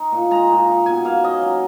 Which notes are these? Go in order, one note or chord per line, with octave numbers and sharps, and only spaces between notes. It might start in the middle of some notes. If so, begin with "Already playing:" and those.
Already playing: D#4
A#2
G#3 A#5
A#2
D#4
B2 G#5
A#3 F5
C#4 D#5
F#3